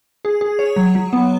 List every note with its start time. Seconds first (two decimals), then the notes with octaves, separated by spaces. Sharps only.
0.25 G#4
0.41 G#4
0.59 C#5
0.76 F#3
0.95 F#3
1.13 B3